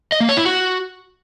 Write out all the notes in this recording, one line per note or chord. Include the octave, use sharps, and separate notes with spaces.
D#5
A#3
C#5
E4
F#4